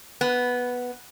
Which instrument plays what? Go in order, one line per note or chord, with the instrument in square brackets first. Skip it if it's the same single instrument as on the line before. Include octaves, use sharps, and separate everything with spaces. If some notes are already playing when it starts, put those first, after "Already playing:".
[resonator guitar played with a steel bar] B3